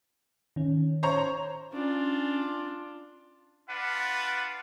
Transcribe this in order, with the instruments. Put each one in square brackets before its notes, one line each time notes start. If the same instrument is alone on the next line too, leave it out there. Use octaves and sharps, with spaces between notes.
[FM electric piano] D#3 C#4
[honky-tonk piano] C5 C#5 A#5
[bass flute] C#4 [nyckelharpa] D4 F4
[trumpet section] D4 F4 B4 F#5